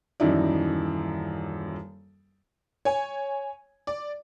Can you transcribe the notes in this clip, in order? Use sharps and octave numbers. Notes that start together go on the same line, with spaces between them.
D#1 F#2 E3 D#4 E4 D5
C#5 G#5
D5